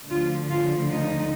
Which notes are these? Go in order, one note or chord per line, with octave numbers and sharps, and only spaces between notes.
D2 D3 F3 F4
F4
D#4